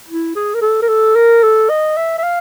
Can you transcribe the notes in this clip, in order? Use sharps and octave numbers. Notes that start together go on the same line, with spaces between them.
E4
G#4
A#4
A4
A#4
A4
A#4
A4
D#5
E5
E5
F5